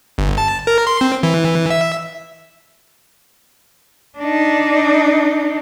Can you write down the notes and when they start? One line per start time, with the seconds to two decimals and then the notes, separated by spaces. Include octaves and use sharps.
0.18 G1
0.38 A5
0.67 A#4
0.87 C6
1.01 C4
1.23 E3
1.70 E5
4.18 D4 D#4